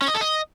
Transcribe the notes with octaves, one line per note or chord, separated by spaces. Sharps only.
C#4
D#5
A4
D#5